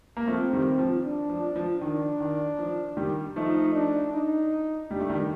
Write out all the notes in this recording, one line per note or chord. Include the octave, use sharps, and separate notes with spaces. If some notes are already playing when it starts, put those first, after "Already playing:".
A#3
F3 A3 C4
D#3 G3
F3
D4
F3
F3
D#3 D4
D#3
F3
D#3 G3
F3 A3 D#4
D4
D#4
G3 D4
A3
D#3 G3